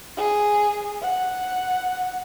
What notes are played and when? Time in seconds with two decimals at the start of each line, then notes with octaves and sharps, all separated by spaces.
0.17 G#4
1.02 F#5